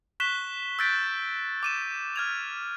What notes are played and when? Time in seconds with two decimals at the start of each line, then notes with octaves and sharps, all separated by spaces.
0.20 C#6 F#6 B6 E7 G7
0.79 E6 F#6 G6 A6 B6 D7
1.63 D6 D#7 E7
2.16 F6 G#6 F7